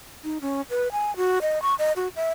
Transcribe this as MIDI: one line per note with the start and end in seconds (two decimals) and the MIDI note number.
0.24 0.38 63
0.41 0.61 61
0.70 0.88 71
0.92 1.15 80
1.17 1.39 66
1.42 1.61 75
1.62 1.74 85
1.79 1.92 75
1.96 2.08 66
2.16 2.31 76